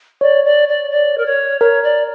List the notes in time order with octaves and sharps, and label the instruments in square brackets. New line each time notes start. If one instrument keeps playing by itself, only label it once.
[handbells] C#5 [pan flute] D5
[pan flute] D5
D5
D5
A#4
C#5
[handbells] A#4 [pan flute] C#5
[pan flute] D5